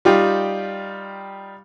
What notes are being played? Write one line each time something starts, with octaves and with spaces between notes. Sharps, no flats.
G3 D#4 F4 G4 G5